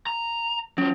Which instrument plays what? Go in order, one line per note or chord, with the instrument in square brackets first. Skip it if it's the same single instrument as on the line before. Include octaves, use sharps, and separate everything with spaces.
[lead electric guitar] A#5
[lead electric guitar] F#3 F4 [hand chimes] C#4